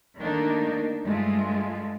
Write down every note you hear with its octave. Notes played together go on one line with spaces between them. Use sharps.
D#3 A3 A#3 D4 D#4
G2 G#3 A3 F4